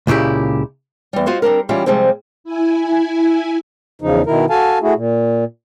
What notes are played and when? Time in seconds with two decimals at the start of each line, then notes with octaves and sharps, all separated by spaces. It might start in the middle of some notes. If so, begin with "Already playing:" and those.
0.07 C#2 A#2 C#3 E4 G4
1.13 E2 G3
1.26 F4 F#4 C5 D#5
1.42 G3 C4 D4 A#4
1.69 E3 G3 C#4 E4 F4 G4
1.86 C3 F3 G3 G#3 C4
2.44 E4 G#5
4.02 E2 C#3 F3 D#4
4.26 B2 D#3 E4 A#4
4.50 F#4 A4 F5 G#5 A5
4.81 A3 E4 F#4 G#4
4.95 A#2